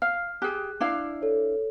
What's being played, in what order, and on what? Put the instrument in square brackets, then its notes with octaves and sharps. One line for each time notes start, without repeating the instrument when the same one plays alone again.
[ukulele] F5 [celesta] F6
[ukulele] G4 G#4 [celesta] F#6
[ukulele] D4 E4 F5
[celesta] A4 C#5